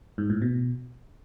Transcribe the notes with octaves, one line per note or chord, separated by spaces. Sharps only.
G#2
A2
B2